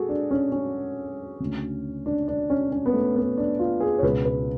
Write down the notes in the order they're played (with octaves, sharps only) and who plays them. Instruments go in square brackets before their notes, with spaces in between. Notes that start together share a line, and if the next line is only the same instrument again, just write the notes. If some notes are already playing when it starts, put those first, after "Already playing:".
Already playing: [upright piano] F#4 G#4 A4
D4
C#4
C#4
D2 C#3
D4
D4
C#4
C#4
B3
A3
B3
D4
F4
G#4
C#5
C#2 B2 B4
B4